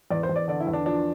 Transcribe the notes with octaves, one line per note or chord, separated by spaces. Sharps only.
E2 D5
C5
E2
D5
D3 D5
E4
E2
D4
F3 D4